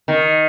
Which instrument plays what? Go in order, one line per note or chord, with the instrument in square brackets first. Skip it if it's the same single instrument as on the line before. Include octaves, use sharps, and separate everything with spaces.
[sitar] D#3